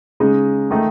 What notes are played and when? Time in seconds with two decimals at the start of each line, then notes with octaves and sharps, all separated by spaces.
0.20 C#3 G#3 D#4
0.71 D#3 A3 D#4